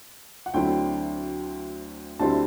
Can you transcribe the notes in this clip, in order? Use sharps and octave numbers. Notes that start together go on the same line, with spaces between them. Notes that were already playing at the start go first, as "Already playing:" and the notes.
F#5
D2 D3 F#3 C4 E4 G5
D2 D3 G3 C4 E4 A5